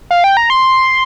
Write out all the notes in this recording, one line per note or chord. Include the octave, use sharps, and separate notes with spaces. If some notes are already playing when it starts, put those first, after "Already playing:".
F5
G5
A#5
C6